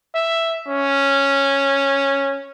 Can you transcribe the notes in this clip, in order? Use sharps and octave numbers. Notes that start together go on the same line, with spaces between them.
E5
C#4